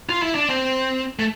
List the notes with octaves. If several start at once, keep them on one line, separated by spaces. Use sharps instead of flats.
F4
E4
D4
C4
A3